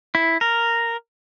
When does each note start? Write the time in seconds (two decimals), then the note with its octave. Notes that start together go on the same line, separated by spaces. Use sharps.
0.15 E4
0.41 A#4